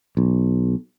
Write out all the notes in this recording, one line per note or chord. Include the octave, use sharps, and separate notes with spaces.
B1